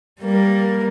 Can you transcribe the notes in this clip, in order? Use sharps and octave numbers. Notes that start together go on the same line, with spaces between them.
G3 A#3